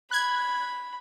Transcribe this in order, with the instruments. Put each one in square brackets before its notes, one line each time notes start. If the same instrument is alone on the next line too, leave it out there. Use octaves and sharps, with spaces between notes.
[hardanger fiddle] B5 [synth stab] F#6 G#6